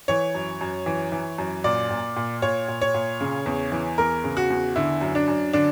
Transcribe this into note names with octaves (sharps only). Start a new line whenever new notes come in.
E3 C#5
F#2
F#2
E3
E3
F#2
A#2 D5
A#2
A#2
A#2 C#5
A#2
C#5
A#2
C#3
E2
E3
E2 A#4
C#3
F#4
E2
D3 E4
F#2
D4
F#2
D3 D4